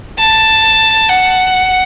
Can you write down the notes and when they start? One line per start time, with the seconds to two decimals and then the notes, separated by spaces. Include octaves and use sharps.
0.19 A5
1.09 F#5